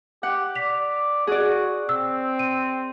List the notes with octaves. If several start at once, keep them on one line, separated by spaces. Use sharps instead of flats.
G4 F#5
D5 B6 F7
F#4 G#4 D5
C4 E6
D#7